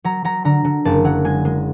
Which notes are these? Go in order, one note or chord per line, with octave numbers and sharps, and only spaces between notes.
F#3 A#5
F#3 A#5
D3 A#5
D3
F#1 A5
F#3 F#5
G#3 G#5
G#3